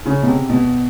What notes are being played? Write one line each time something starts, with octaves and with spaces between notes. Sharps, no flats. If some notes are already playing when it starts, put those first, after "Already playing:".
C#3
B2
C3
B2